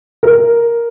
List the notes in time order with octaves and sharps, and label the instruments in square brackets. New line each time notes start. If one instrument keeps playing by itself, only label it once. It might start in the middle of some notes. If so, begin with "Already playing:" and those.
[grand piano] A#4